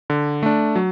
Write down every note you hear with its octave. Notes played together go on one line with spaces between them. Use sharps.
D3
A3 D4
F#3